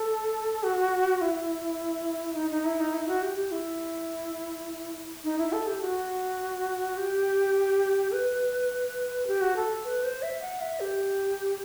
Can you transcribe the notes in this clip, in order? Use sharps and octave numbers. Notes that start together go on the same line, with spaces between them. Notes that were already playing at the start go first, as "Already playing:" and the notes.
Already playing: A4
F#4
E4
D#4
D#4
E4
D#4
E4
F#4
G4
G4
E4
D#4
E4
A4
G4
F#4
G4
B4
G4
F#4
A4
B4
C5
E5
F#5
E5
G4